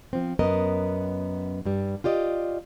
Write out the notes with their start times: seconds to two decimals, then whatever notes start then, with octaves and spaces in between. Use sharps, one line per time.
0.13 F3 C4
0.39 F#2 B3 A#4 D#5
1.66 G2 G3
2.04 F4 G4 D5 D#5